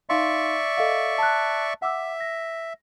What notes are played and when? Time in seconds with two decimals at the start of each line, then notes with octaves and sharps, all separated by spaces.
0.09 D#4 D5 E5 F5 C6 C#6
0.77 A4 D#5 F5
1.18 A5 F#6
1.82 E5 F#5 D6 E6
2.20 A#6